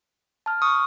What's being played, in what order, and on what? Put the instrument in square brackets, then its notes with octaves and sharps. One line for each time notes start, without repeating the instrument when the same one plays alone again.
[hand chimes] A5 F6
[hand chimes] C#6 [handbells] D#6